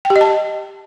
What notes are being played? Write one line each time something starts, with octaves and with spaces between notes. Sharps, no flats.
G5
G4
D#5
A5